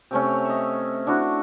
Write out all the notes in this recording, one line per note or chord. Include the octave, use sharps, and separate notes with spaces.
C3 A3 C#4
D#5 E5
D4 E4 F#4